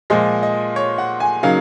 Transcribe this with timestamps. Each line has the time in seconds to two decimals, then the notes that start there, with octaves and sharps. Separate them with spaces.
0.10 A#2 F3 G#3 D#5
0.43 D#5
0.76 C#5
0.98 F#5
1.20 G#5
1.43 C#3 F#3 A#3 D#4 F5